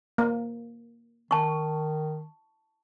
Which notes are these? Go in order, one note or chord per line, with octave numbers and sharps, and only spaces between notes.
A#3
D#3 A5 C#6